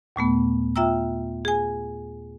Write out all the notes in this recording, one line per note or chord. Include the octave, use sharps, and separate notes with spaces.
D#2 A#2 A3 B3
F4 E5 G5 A#5 E6
G#4 G#5